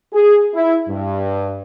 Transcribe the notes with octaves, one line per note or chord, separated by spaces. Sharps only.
G#4
E4
G2